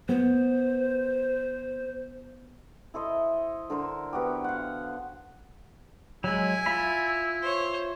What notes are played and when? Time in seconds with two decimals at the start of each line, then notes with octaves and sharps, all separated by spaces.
0.09 B3 C5
2.94 E4 A4 C5 D#5
3.70 D3 A#4 C5
4.13 B3 F#4 G4
4.44 F5 F#5
6.24 F#3 G#3 E4 G#5
6.66 F4 E5 B5
7.42 C5 C#5